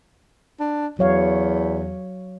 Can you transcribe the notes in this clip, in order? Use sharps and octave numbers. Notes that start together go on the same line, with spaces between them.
D4
E2 F#3 C#5 F5